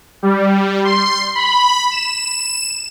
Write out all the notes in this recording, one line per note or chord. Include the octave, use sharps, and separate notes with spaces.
G3
C6
B5
E7